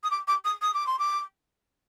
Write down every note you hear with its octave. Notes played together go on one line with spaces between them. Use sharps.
D#6
D6
D6
D#6
D#6
D6
C6
D6